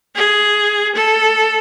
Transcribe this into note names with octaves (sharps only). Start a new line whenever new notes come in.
G#4
A4